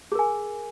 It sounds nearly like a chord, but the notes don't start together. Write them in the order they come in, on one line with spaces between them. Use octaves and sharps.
G#4 A#4 G#5